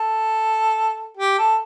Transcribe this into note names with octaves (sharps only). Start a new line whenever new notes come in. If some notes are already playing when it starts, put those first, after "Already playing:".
Already playing: A4
G4
A4